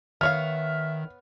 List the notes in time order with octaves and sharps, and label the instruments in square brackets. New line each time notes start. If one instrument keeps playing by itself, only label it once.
[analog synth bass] D#3 [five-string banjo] B3 C#5 F5 [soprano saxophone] E5 [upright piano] F6